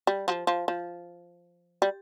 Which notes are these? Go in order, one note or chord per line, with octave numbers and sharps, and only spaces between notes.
G3
F3
F3
F3
G3